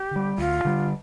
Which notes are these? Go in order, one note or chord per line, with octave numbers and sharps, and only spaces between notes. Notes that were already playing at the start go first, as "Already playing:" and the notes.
Already playing: G4
D3 G3
D2 F4
D3 G3